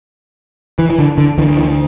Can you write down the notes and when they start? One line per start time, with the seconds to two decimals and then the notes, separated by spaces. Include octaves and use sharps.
0.79 E3
0.90 E3
0.99 D3
1.18 D3
1.38 D2 D3 E3
1.57 E3